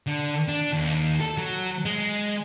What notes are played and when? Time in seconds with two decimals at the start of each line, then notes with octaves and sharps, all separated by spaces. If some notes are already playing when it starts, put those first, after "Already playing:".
0.07 D3
0.48 D4
0.73 D#2
1.20 A4
1.38 F#3
1.85 G#3